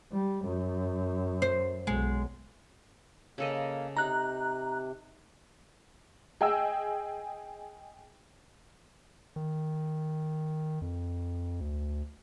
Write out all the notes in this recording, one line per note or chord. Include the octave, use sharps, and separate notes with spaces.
G3
F#2
C5
B1 G#3
C#3 A#3 A4 D#5
C3 D#4 A#5 F#6
G#4 D#5 G5 G#5 E6
D#3
F2
D2